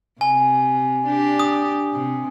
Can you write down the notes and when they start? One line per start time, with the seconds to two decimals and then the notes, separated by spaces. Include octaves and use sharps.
0.21 C3 G#5
1.07 D4 G4
1.39 D#6
1.93 C3